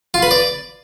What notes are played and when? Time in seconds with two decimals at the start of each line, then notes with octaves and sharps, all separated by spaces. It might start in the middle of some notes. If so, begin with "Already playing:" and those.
0.14 F4
0.23 B4
0.31 D5